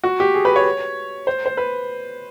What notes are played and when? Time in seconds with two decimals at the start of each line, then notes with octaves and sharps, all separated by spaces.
0.04 F#4
0.20 G4
0.34 G#4
0.45 B4
0.56 C#5
1.27 C5
1.46 C5
1.57 B4